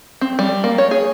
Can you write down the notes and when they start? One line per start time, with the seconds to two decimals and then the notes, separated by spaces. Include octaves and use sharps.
0.21 C4
0.39 G3
0.64 A#3
0.78 C#5
0.91 G#4